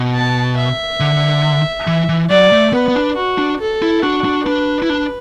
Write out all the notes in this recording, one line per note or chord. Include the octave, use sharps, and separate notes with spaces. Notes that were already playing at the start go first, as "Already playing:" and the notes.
Already playing: B2
A5
E5
D3
E3
E3
F#3 D5
A3
B3 B4
B3
D4
F#4
D4
A4
E4
D4 F#4
D4
D4 B4
E4
D4